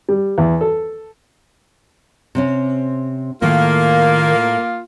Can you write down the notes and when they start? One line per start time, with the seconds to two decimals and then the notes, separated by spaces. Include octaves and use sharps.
0.09 G3
0.38 E2
0.61 A4
2.35 C3 C4 C#4
3.42 A2 D#3 A3 A#3 F4